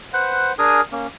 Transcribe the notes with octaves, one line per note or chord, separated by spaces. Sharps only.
B4 C5 F#5
D4 G#4 A#4 G#5 D#6 F6
A#3 C#4